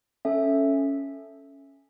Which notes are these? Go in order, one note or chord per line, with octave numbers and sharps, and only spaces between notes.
C#4 A4 E5